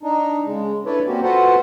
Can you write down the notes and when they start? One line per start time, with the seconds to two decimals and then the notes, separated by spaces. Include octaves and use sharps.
0.03 D4 D#4
0.46 C#3 G#3
0.86 D4 E4 A4 B4 C#5 D5
1.07 A#2 A#3 C4 C#4 F#4 G4
1.23 F4 F#4 A4 B4 C5 F#5